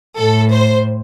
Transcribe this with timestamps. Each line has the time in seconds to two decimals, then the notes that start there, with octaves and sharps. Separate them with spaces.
0.19 A2 A4
0.53 C5